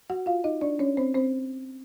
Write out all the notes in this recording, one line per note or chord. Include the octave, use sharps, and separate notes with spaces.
F#4 F#5
F4 F5
D#4 D#5
D4 D5
C#4 C#5
C4 C5
C4 C5